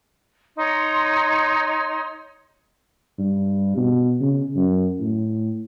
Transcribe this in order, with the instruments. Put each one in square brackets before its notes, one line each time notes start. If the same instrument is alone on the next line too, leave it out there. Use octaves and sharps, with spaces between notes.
[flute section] D#4 C#5 C6
[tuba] G2
B2
C#3
F#2
A2